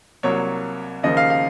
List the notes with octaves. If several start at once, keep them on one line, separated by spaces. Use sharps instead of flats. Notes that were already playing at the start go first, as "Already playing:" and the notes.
C2 C3 F#3 A#3 C#5
D#2 C#3 F3 A#3 D#5
F5
F5